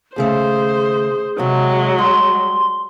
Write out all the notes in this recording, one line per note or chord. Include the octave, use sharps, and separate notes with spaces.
D#2 C#3 A3 G#4 C5
D#2 C3 F#3 G#3
G3 C6